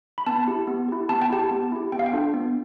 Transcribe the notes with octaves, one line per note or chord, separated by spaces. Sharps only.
B5
B3 A5
E4 G4
B3
E4 G4
B3 A5
G5
E4 G4 A5
B3
E4 G4
B3 G5
F5
G5
D4 F4 A4
B3